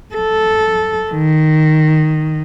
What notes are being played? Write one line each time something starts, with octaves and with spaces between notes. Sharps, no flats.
A4
D#3